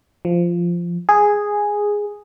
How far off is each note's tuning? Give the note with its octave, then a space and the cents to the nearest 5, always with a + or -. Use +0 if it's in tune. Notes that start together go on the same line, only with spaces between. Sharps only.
F3 -10
G#4 -5